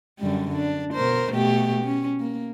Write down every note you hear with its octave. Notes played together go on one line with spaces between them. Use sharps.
F#2 D3 G3
D4
B2 A#4 C5
B2 A3 G4
C#4
A#3